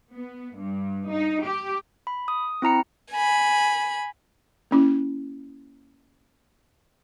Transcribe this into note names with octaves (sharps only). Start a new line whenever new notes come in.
B3
G2
D#4
G4
B5
D#6
C4 E4 A#5 C#7
G#5 B5
A#3 C#4 E4